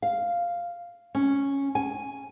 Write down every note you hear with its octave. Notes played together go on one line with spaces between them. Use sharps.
F5
C#4
G#5